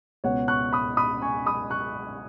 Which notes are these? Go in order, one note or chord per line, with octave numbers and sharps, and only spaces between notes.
C#2 B2 B3 C#5 F#5
C#6 F#6
B5 D#6
B5 D#6
G#5 C#6
B5 D#6
C#6 F#6